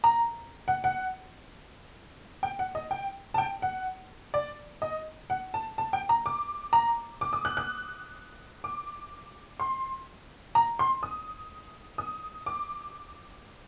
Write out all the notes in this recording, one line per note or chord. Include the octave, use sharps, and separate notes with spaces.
A#5
F#5
F#5
G5
F#5
D#5
G5
A5
G5
F#5
D5
D#5
F#5
A5
A5
G5
A#5
D6
A#5
D6
D#6
F#6
F#6
D6
C6
A#5
C6
D#6
D#6
D6